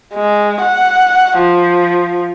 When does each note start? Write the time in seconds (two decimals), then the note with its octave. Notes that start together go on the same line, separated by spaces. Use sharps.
0.14 G#3
0.61 F#5
1.38 F3